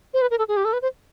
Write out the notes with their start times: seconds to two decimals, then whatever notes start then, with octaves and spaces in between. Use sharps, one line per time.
0.14 C5
0.22 B4
0.31 A#4
0.39 A4
0.48 G#4
0.57 G4
0.65 A4
0.73 B4
0.82 C5